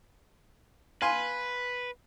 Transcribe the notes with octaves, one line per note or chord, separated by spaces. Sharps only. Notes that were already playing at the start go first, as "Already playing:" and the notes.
B4 F5 G#5 C6